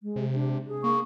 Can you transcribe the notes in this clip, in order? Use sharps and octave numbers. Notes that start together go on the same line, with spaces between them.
G#3
C3
D4
G#4
A#3 C#6